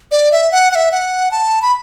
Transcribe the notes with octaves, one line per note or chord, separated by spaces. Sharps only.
D5
E5
F#5
F#5
E5
F#5
A5
B5